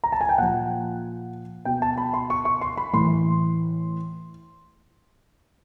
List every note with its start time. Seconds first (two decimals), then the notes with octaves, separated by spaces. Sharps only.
0.04 A#5
0.12 A5
0.21 G#5
0.29 G5
0.38 A#2 F3 F#5
1.65 B2 G5
1.82 A5
1.98 B5
2.14 C6
2.30 C#6
2.45 C#6
2.61 C6
2.77 B5
2.93 A2 E3 C6